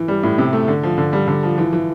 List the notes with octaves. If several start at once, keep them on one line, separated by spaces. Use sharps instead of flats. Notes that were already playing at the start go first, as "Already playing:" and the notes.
Already playing: E3
G3
A2
C3
A3
D3
F3
D3
G3
D3
F3
E3
E3